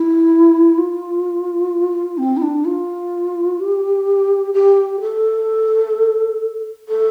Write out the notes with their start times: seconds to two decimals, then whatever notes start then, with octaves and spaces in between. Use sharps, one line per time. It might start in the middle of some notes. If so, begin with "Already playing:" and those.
Already playing: E4
0.78 F4
2.18 C4
2.37 E4
2.42 D4
2.65 F4
3.60 G4
4.54 G4
5.01 A4
6.89 A4